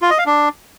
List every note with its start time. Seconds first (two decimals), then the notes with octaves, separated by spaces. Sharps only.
0.02 F4
0.10 D#5
0.18 F5
0.26 D4